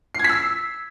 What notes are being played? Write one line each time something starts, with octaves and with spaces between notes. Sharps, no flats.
E6 G#6 B6 C7